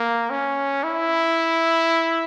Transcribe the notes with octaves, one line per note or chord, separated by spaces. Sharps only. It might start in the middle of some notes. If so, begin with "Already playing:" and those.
Already playing: A#3
C#4
E4